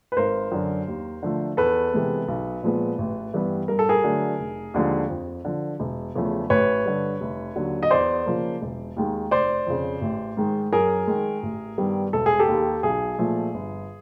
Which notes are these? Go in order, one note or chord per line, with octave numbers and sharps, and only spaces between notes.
B4
G#1 A#4 C5
F#2 D3
D#2
D3 F3 A3
E2 A4 B4
C3 E3 G#3 B3
B1
A#2 F3 G#3 B3
A1
G2 E3 G3 B3
G2 A#4
A4
G#4 A#4
D3 F#3 A3
F1
D#2 D3 F3 G#3
F2
D3 F3
E1
E2 C#3 F3 A3
A1 B4 C#5
G2 D3
F1
D#2 D3 F#3
D#5
E2 C5 D5
C#3 F3 A#3
E1
D#2 D#3 G#3
F1 C5 D5
F2 C#3
A1
G#2 D#3 G#3
F#2 G#4 A#4
D#3 G#3
A1
G2 D#3 G3 B3
E1 A4
G#4
G4 A4
D#2 D#3
B1 G#4
A#2 F3 A3
G1